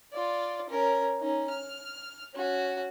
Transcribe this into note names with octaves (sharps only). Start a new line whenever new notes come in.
F4 D5
C#4 A#4
C#4 D#4
F6
C#4 F#4